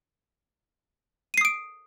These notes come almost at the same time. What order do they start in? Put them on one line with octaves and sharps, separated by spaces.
D#7 C7 D#6 D7